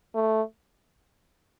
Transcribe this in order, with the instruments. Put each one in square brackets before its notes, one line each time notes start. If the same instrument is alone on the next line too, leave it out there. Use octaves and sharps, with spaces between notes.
[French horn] A3